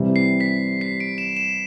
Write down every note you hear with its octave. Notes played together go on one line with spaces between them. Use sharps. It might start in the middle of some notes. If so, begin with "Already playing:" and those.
Already playing: C3 E3 G3
C7
B6
C7
D7
E7
E7